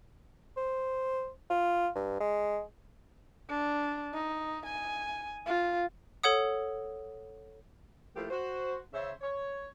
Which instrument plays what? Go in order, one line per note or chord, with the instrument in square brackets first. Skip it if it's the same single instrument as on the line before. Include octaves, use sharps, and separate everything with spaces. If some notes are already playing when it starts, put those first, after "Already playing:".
[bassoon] C5
F4
G2
G#3
[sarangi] D4
D#4
G#5
F4
[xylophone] A4 C#5 F#5 D#6
[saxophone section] F3 A3 A#3 E4 F4 G4
F#4 C5
C#3 C5 C#5 E5
C#5